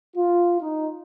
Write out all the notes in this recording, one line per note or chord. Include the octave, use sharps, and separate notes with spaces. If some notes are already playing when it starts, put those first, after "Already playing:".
F4
D#4